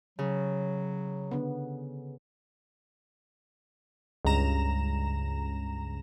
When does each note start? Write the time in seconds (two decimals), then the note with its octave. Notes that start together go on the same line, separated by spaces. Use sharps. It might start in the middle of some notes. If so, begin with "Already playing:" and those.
0.19 C#3 F#3
1.31 D3 B3
4.25 C#2 G2 A#5 E7